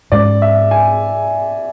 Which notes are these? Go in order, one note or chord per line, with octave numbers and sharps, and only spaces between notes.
G#2 G#3 C#4 D5
E5
G#5